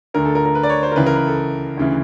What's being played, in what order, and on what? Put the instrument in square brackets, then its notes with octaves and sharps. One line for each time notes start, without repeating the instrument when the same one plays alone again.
[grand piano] D2 D3 A#4
A4
A#4
A#4
B4
D5
C#5
C5
A#4
C#2 C#3 E3 B4
A#4
B4
A4
D2 C#3 E3